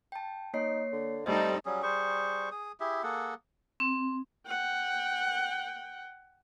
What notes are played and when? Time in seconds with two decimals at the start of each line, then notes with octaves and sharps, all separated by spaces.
0.12 G5 A5
0.54 A#3 D#4 C#5 C7
0.92 D3
1.26 G3 A3 C4 D#4 A4 D#5
1.65 F#3 G3 C#4 G#4
1.83 G3 G#4 C5 C#6
2.51 G#4 D#6
2.80 E4 G4 G#4 E5
3.03 A#3 G#4 A4 F#5
3.80 C4
4.47 F#5 G5